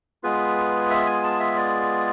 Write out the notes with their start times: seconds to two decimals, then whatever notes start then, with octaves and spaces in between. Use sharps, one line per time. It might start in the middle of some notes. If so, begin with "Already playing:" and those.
0.23 G#3 B3 F4 G#4 B4
0.90 E5
1.06 G#5
1.23 A5
1.40 E5
1.56 D5